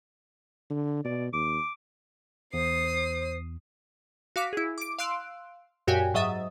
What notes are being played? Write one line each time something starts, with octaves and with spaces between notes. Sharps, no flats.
D3
B2 D5
D#2 D6
E2 C5 D#6 C7
F#4 F5 D6 B6
E4 G#4
D6 D7
F5 C6 E6 F#6 D7
F#2 A#2 F#4 G4 G5 G#5
G#2 F#3 D#5 E5 D#6 A6